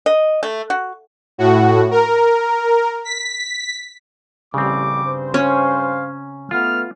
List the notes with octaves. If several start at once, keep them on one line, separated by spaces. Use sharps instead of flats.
D#5
A3
F#4
A2 F#4
A#4
B6
A1 C#3 G3 C4 D6
G2 C5
C#4 F5
A3 B3 F4 F6